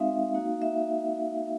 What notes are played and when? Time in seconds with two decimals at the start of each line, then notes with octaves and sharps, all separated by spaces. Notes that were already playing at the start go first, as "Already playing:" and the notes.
Already playing: G#3 C4 D#4 F#4 E5 F5
0.34 A#3 D#4 F#4
0.62 E5